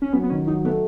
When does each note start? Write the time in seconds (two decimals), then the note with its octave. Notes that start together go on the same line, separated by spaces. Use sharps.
0.02 C#4
0.13 F#3 B3
0.23 B3
0.30 D#3 C#4
0.47 F#3 D#4
0.65 A3 B3